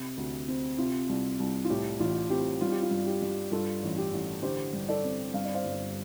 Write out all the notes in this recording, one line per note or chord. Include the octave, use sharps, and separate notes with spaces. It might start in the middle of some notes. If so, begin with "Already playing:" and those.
Already playing: C3
D2
C4
C3 F4
C2
C2
F4
A2 G4
A1 F4
C4 G4
G3 F4
G4
F4
G2
G4
G2
G2 F4 A4
A1
G4
A1
D3 G4 C5
G2
A4 D5
C4
G2 F5
D5
C5 F5
G1